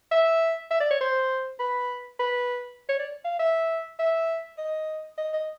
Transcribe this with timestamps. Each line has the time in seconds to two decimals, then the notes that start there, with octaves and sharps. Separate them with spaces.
0.12 E5
0.71 E5
0.80 D5
0.91 C#5
1.01 C5
1.60 B4
2.20 B4
2.89 C#5
2.99 D5
3.25 F5
3.39 E5
3.99 E5
4.58 D#5
5.18 D#5
5.33 D#5